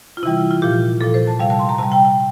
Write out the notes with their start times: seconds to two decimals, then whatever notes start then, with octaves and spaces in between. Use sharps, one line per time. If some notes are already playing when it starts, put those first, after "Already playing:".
0.17 F4
0.23 C3 E3 G3 E4
0.51 F4
0.62 A#2 F3 G4
1.01 A#2 F3 A4
1.14 C5
1.27 A5
1.39 C3 G3 F5
1.50 A5
1.59 C6
1.69 A#5
1.78 C3 G3 A5
1.92 G5
2.05 G5